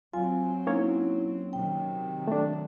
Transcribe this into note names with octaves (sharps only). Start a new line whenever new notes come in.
F#3 C4 F4 G#5
A#3 C#4 D#4 E4 C#5
C3 D#3 F#3 G5
A3 D4